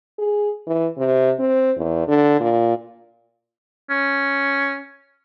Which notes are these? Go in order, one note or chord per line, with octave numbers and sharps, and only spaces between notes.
G#4
E3
C3
C4
E2
D3
A#2
C#4